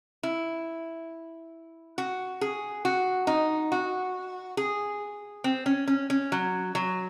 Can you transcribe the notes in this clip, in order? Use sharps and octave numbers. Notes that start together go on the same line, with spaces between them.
E4
F#4
G#4
F#4
D#4
F#4
G#4
C4
C#4
C#4
C#4
F#3
F#3